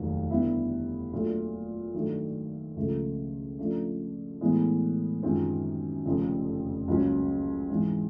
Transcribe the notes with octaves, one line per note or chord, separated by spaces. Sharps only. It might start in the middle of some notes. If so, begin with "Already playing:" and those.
Already playing: F1 D#2 D#3 F#3
D3 G3 B3 E4
A#2 F#3 A3 D4
G2 D#3 F#3 A3 D4
C#2 C#3 F3 A3
C#3 F3 A3 D4
A2 E3 G#3 B3 E4
F#2 D#3 G#3 C4 F4
F1 F2 C#3 F3
C#2 C#3 F#3 A#3 C#4
G#2 E3 G#3 C4